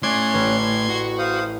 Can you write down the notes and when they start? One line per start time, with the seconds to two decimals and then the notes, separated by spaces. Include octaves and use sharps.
0.03 A2 A3 C#4 C#5 D5 C6 F#6 G#6
0.34 A1
0.89 F#4 C#6
1.19 C5 F5 D#6